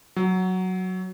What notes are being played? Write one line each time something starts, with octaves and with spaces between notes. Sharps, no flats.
F#3